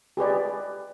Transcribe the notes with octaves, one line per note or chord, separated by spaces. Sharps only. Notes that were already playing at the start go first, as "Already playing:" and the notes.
G4 G#4 B4 D5